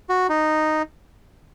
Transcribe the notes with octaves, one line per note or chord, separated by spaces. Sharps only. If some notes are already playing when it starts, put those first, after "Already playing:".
F#4
D#4